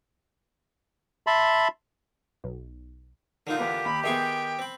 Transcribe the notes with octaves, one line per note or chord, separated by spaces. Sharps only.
E5 A5 B5 C6
B1
D3 A#3 D#4 F4
E2 B3 G4
D#2 B5
D#3 B3 G#4 E5 G5 C6 C#6
C4 B5